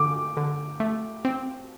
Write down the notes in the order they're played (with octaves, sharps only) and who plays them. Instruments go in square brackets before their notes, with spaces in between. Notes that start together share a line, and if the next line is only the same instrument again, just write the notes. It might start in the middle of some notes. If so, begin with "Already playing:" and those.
Already playing: [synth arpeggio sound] D3 [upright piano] D6
[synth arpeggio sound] D3
A3
C4